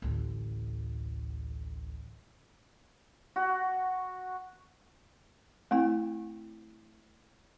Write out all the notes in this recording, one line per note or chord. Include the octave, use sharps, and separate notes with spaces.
A1 D2
F#4
A3 C4 E4 G5